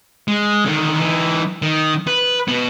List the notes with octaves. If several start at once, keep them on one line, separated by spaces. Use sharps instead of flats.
G#3
D3 D#3
E3 D#4
D#3
B4
B2 B3